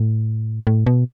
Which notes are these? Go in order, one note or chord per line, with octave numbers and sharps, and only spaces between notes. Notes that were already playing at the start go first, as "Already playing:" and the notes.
Already playing: A2
A2
B2